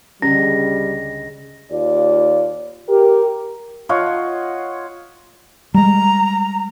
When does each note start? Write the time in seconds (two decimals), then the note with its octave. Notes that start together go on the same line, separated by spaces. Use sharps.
0.22 C#2 D3 G3 C#4 A#6
1.72 D#2 F4 D5
2.89 G4 A#4
3.89 F4 C#5 D#5 F#5
5.74 G3 G#3 A#5